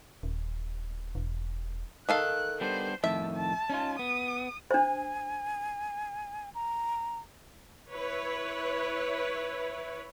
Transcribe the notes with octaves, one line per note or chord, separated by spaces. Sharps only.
D#1
E1
D#3 A4 F5 F#6
G3 B3 D4 C5
F2 A2 D#3 E5 A5
A5
C#4 D#4 F4
B3 D#6
D4 C5 G#5
A#5
E4 B4 C#5